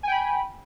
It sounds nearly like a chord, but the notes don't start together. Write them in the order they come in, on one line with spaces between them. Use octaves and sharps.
G#5 G5 B5